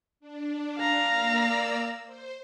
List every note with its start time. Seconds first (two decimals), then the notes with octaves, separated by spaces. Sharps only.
0.20 D4
0.78 F5 A#5
1.08 A#3 D5 E6
2.06 C5